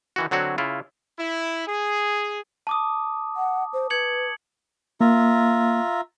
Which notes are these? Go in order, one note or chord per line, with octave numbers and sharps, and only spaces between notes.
D#3 E3 F#4
D3 F#3 C4 F#4 C#5
C#3 E4 F4
E4
G#4
A5 D6 D#6
F#5
C5
B4 G#6 C#7 F#7
A#3 F4 E5 A#5